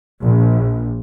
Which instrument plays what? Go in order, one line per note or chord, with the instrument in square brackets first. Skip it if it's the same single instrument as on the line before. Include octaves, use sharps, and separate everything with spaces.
[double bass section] A#1